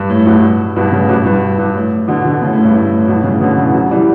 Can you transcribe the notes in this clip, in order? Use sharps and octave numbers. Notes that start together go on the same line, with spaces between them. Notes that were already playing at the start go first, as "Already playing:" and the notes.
Already playing: G2
A2
G2 B2
G2 B2
A2 C#3
G2 B2
G2
G2
A2
B2 D3
B2 D3
A2 C#3
A2
G2
A2
A2
G2 B2
A2 C#3
B2 D3
C#3 E3
D3 F#3
E3 G3